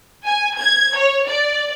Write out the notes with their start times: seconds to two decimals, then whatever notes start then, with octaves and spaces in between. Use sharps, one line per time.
0.25 G#5
0.58 G#6
0.97 C#5
1.27 D5